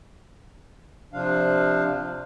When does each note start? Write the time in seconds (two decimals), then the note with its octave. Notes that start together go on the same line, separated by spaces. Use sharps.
1.13 C3 F3 D4 F5